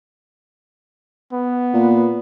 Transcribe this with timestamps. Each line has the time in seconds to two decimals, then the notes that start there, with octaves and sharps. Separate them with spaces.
1.32 B3
1.73 A#2